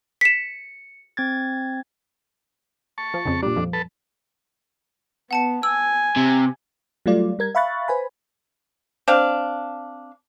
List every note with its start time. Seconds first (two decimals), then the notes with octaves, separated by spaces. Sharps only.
0.21 B6 C#7 E7
1.17 C4 G#6 A6
2.98 A5 C#6
3.14 F3
3.26 F2 C#3
3.43 A#2 G3 D4
3.56 F2 F3
3.73 A4 B4 A5
5.31 B3 F#5 A5 C#7
5.63 G#5 E6
6.16 C3
7.06 F#3 G3 A3 F4 D5
7.39 G3 A#4 G#6
7.55 E5 F5 B5 C#6 F#6 A6
7.88 B4 C5 G#5 B5
9.08 C4 D4 F5